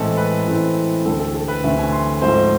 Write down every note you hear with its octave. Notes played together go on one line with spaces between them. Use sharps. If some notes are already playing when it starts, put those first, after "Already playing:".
Already playing: A2 E3 G#3 C4 A4
B4
A2 E3 G#3 C4
D2 D3 A3 C4 A4
A4
A4
B4
D2 D3 A3 C4 E5
G#5
C6
G#2 F3 A3 C4 C5